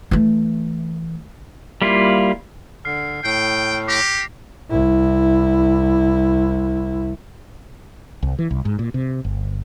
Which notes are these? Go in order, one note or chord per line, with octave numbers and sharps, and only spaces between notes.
E3 A3
G3 A#3 E4 F4
D3 F6 C7
A2 G5 C7
G4 D6 A#6 F7
C2 E4
C2
E3
C2
G#2
A#2
C3
G1